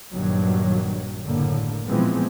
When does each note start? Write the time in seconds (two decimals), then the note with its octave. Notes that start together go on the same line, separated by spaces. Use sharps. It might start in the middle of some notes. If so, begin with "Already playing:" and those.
0.12 A#1 G2 D#3 F#3
1.24 F#1 A2 D3 A#3
1.88 A#2 E3 F3 G#3 B3 C4